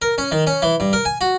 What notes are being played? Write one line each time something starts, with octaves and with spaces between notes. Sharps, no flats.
A#4
C#4
D#3
C#4
E3
G2
A#4
G#5
F#4